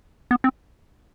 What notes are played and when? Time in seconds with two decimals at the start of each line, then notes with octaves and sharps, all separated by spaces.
0.31 B3
0.44 C4